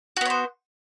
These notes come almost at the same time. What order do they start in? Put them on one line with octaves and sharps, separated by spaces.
F#4 B3 C#5 C5